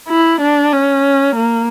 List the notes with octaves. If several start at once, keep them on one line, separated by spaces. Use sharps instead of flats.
E4
D4
C#4
A#3